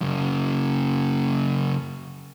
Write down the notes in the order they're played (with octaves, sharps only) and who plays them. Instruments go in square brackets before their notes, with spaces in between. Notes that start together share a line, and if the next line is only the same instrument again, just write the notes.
[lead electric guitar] F#2 C#3